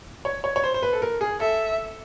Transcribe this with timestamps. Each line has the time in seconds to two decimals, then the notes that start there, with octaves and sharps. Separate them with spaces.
0.25 C#5
0.44 C#5
0.56 C#5
0.64 C5
0.74 C5
0.83 B4
0.93 A4
1.02 A#4
1.21 G#4
1.40 A4 E5